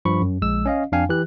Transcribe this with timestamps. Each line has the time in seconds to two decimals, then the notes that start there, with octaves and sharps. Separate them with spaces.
0.05 G2 F3 B5 C#6
0.21 F#2
0.42 A#1 G#3 E6
0.66 C#4 D#5 F5
0.92 F2 D4 F5 G5 G#5
1.09 E3 G4 F#6